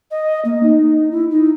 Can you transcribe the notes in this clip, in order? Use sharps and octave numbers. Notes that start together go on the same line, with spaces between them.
D#5
A#3
D#4
E4
D#4